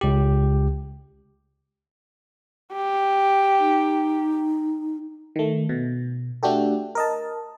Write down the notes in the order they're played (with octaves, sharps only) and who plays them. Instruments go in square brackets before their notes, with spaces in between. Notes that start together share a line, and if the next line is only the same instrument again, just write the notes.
[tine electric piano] C#2 G4
[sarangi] G4
[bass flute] D#4
[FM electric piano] D#3 A3
B2
A3 D4 F#4 G4 A4
A#4 D#5 A5